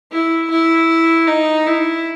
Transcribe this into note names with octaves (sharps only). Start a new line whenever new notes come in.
E4
E4
D#4
E4